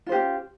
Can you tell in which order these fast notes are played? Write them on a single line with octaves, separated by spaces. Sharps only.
F4 C5 G4 C#4